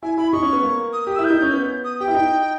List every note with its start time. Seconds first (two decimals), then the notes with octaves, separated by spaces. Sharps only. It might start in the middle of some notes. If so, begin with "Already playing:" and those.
0.03 E4 G#5
0.17 E4 B5
0.33 D#4 C#6
0.43 C#4
0.53 B3
0.63 A#3
0.93 D#6
1.07 G4
1.16 E4 E6
1.24 G6
1.30 D#4
1.42 C#4
1.54 B3
1.84 D#6
2.00 G4 G5
2.08 E4
2.15 D#4